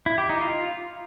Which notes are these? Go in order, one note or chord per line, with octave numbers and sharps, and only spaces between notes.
E4
G4
D#4
F4